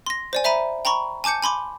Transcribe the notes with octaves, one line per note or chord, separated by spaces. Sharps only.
C6 A#6
C5 D5 G#5
C5 E5 A#5 B5 D#7
G5 A#5 B5 C#6
G#5 A5 D6 G6 C#7
G#5 B5 C6 D6